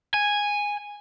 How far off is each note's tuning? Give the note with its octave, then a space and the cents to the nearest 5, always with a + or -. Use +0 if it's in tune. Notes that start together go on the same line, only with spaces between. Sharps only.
G#5 -10